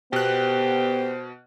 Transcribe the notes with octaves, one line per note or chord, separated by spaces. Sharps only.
B2 B3 G4 C5 F#6